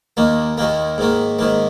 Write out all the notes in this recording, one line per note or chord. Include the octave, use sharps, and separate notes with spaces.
D#2 D#3 A#3
D#2 D#3 A#3
G#2 D#3 A#3
G#2 D#3 A#3